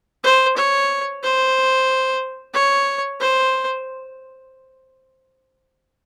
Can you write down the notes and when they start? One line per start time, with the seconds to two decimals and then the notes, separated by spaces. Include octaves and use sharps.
0.24 C5
0.56 C#5
1.23 C5
2.54 C#5
3.20 C5